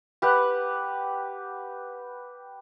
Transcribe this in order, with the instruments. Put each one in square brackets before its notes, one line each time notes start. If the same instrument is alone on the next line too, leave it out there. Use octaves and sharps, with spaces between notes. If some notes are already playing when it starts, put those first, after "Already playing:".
[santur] G4 B4 F#5